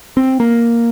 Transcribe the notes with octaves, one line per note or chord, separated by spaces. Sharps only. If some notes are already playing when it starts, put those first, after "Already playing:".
C4
A#3